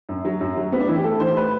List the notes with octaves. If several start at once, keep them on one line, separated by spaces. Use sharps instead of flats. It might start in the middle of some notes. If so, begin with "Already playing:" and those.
F#2
F#3
F#2
F#3
A2 B3
D4
E3 E4
G4
A2 A4
E3 C5
A2 B4